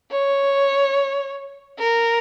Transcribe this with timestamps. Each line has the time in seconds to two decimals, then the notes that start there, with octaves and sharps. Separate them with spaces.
0.12 C#5
1.79 A#4